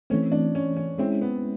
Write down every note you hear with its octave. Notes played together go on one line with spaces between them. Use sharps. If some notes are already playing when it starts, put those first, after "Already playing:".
E3 A3 C4 C#4
D4
C#4
C#4
G#3 C4 C#4 E4
B3